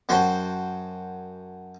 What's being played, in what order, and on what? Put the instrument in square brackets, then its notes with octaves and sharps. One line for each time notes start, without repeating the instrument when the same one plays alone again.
[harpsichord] F#2 F#4 C5 G5 A5